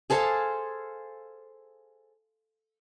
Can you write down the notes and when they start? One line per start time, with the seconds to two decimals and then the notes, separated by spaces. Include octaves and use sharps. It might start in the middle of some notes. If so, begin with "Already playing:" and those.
0.10 G#4 A4 C5 F5